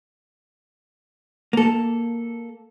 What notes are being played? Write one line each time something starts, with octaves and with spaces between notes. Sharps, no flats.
A#3 A4